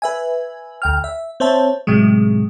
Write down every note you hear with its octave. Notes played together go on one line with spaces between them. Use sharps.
B4 E5 G#5
D2 G5 F6
E5
C4 C5 C#5 E5 A5
A2 C3 F#3 G#3